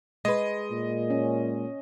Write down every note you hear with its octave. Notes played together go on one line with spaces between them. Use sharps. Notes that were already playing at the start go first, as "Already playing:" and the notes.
G#3 B4 D#5
A#2
C#4